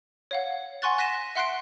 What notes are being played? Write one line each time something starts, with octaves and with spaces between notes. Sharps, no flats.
C#5 F5 F#5
F#5 G#5 C6 C#6 F#6 A6
F#6 A#6 B6 D#7 E7
E5 F#5 C6 F#6 C7 D7